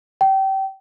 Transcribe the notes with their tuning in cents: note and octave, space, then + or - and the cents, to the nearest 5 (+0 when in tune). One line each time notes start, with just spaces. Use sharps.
G5 -25